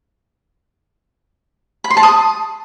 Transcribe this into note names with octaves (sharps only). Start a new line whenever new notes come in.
B5
C6
A5
D#6